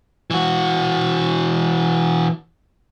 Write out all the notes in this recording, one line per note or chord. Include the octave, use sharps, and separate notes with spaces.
E3 F#4